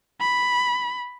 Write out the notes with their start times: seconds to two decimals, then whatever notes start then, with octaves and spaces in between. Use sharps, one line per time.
0.20 B5